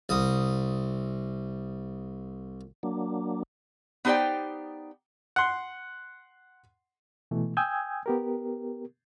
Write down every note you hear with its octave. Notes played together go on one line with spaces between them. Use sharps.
C2 D#6
F#3 A#3 D4
B3 D#4 G4 C5 D5 G5
F#5 C6
B2 E3 A3
G5 G#5 D#6 E6 G6 G#6
B3 G4 A#4